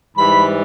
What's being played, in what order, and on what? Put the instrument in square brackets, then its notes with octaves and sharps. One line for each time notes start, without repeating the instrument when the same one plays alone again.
[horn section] G#2 E3 G3 B5